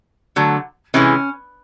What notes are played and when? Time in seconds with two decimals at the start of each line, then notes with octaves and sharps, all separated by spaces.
0.36 D3 F#3 A3
0.94 C3 E3 G#3 C#4